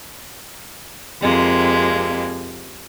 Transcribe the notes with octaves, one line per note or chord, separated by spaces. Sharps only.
F2 C3 G#3 A#3